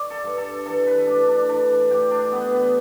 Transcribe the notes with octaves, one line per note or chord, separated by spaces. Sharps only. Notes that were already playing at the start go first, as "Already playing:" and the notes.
Already playing: D5
A4
G2
A4
E3 A4
B4
A2 D4
D4
E3 D4
A2 G4
D4
E3 B3
B3